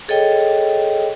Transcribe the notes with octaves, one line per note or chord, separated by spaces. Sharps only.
G#4 A4 C#5 D#5 G5